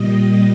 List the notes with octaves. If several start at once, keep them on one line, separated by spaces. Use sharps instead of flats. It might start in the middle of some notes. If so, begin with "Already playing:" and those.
Already playing: A#2 G3 D#5